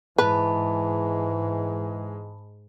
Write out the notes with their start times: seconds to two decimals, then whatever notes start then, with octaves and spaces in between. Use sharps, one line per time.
0.18 G#2 E3 G#3 B4 A5 B5